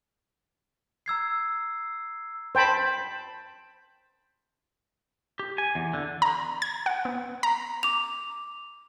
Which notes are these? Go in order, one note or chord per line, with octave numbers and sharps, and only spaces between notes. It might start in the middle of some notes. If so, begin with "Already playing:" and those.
A#5 E6 G#6 C7
C5 G5 A5 B5
G4
G#5
E2
D3
A#5
G#6
F#5
B3
A#5
D6 F7